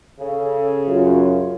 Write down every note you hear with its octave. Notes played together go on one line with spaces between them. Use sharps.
C#3 A4
F#2 F4